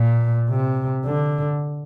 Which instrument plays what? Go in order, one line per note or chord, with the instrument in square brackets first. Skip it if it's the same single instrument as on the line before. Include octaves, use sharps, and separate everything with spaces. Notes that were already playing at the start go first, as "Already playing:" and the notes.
Already playing: [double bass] A#2
C3
D3